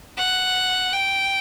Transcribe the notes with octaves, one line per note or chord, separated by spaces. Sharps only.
F#5
G5